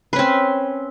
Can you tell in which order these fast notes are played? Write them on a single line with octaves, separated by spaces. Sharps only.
B4 C#4 C4